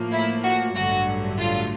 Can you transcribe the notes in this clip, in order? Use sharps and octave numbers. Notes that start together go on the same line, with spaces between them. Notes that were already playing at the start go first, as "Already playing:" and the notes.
Already playing: A2 F3 A#3
E4
F#4
A1 G2 D3 F#3 A3 F#4
F4